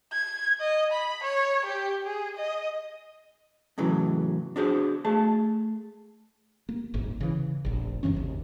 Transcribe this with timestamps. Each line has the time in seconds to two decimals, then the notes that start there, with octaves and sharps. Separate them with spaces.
0.12 G#6
0.60 D#5
0.92 B5
1.23 C#5
1.66 G4
2.05 G#4
2.37 D#5
3.78 A2 C#3 E3 F#3
4.56 D4 F#4 G#4 C5
5.05 A3 G#4 A5
6.69 A#3
6.94 D#1 G#1 G#2
7.20 C#3 E3
7.65 F1 A#1
8.03 G2 C3 E3 C#4
8.14 G#1 D#2